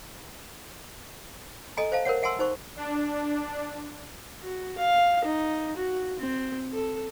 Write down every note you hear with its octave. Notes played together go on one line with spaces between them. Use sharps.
A4 D#5 G#5 A#5
C5 E5 F5 A5
A#4 C5 C#5 F#5
E5 F#5 G#5 A5 C6 E6
D#4 C5 C#6
D4
F#4
F5
D#4
F#4
C4
A4